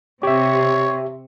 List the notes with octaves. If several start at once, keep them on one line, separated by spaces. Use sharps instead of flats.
C3 G4 C#5 E5